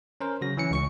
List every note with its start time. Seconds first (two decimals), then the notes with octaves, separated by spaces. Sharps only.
0.21 C#4 A#4 C5
0.41 C#3 F#3 F#4 A#6
0.57 E3 C#4 C#7
0.71 C#2 C#6 C#7